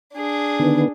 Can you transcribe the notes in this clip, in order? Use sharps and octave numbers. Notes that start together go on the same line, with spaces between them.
D4 G#4
D3 D#3 B3